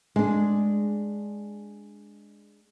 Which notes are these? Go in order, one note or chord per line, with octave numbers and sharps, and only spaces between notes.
G#3 D4